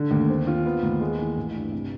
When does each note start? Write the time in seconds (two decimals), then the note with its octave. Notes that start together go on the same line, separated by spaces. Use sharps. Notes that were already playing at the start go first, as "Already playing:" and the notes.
Already playing: D3
0.11 D#2
0.30 C4
0.47 F4
0.65 B3
0.83 D#2
1.01 G#3
1.19 E3
1.37 A1
1.55 G2
1.73 C3